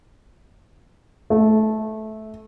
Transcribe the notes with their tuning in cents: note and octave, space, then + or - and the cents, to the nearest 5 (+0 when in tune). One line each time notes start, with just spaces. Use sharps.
A3 -15